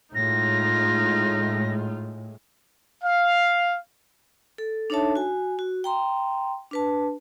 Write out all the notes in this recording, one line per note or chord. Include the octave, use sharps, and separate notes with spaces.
A2 G#3 D#4 F4 A#6
F5
A4
D4 D#4 A4 C#5 E5 A5
F#4 G#5
F#4
G5 A#5 C6
D4 B4 A5